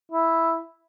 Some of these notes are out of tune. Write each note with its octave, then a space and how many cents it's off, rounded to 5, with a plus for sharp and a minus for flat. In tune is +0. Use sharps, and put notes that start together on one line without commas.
E4 +0